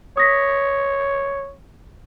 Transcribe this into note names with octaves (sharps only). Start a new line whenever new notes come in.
C#5 D#6 A#6 B6